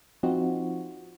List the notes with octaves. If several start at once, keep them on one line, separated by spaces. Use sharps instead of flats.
F3 C4 D#4 F4 F#4